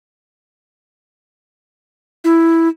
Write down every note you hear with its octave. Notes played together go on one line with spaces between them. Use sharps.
E4